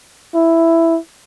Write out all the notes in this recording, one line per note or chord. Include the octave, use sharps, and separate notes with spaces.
E4